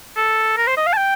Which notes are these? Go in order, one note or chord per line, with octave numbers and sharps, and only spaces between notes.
A4
A#4
C5
D#5
F5
A5
G5